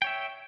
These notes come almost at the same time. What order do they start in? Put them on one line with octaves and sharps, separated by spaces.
G5 C#5 E5